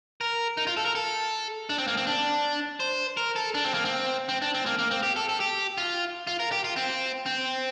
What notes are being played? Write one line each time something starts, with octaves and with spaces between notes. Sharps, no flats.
A#4
D#4
F4
A4
A#4
A4
D4
C4
A#3
C4
D4
C5
A#4
A4
D4
C4
A#3
C4
C4
D4
C4
A#3
A#3
C4
G4
A4
A4
G4
F4
F4
A#4
G4
F4
C4
C4